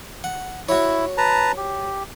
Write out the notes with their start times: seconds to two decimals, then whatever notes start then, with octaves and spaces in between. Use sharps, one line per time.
0.24 F#5
0.69 E4 F#4 C#5
1.18 B4 A5 A#5
1.57 G4